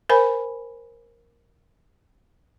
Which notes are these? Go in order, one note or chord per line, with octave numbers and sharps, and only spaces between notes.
A#4 C5 G#5 B5